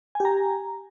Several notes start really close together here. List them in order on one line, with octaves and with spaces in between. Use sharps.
G#5 G4 A#5